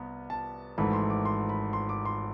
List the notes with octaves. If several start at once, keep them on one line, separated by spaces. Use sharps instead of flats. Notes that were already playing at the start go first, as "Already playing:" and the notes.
Already playing: C2 B3 B5
A5
G#1 G#2 E3 A3 B5
C6
D6
C6
B5
C6
D6
C6